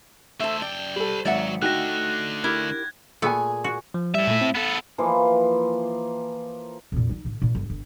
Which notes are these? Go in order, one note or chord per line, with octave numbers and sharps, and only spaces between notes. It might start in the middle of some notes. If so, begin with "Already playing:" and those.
A3 A4 C5 E5
F#2 D5 G5
G3 A4 C5 B5
G#1 F#3 D5 E5 F#5
D3 A3 D#4 F#4 G5 F#6 A#6
E4 G4 A#4 G#6
A#2 A3 B3 G#4 G#5
F#4
F3
A2 G3 E5
A#2 A3
C4
B3 A4 A6
E3 F3 A#3 F4
F2 A#2
G3 D#4
A2 D3
A#2
G1
G1